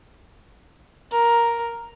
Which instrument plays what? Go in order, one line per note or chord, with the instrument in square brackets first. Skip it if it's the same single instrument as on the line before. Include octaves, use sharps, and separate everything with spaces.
[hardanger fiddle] A#4